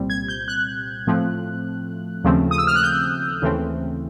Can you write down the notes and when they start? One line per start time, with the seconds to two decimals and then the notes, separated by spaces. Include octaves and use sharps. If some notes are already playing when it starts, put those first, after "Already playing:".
Already playing: C2 A#2 G3 C4
0.10 G#6
0.28 G6
0.48 F#6
1.07 A2 F3 A3 C4
2.24 D#2 C#3 F3 A3 C4
2.51 D#6
2.58 E6
2.67 F6
2.76 F#6
2.83 G6
3.42 D#2 C#3 E3 A3 C4